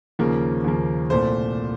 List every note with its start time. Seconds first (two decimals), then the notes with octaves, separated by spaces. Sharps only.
0.19 D#2 C#3 F3 A#3
0.64 D#2 C#3 F3 A#3
1.10 C2 A#2 A3 C5